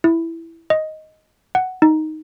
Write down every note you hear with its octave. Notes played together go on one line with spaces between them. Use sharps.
E4
D#5
F#5
D#4